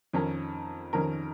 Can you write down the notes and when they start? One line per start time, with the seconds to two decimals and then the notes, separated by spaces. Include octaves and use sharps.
0.13 F2 D#3 C#4 A#4
0.93 F2 D#3 C#4 A#4